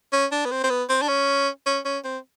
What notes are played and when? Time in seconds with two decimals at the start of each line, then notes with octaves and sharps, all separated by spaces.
0.13 C#4
0.31 D4
0.45 B3
0.51 C4
0.63 C4
0.70 B3
0.89 C4
1.02 D4
1.08 C#4
1.66 C#4
1.85 C#4
2.04 C4